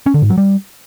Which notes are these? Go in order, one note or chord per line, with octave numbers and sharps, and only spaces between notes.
C#4
D3
G#2
F#3
G3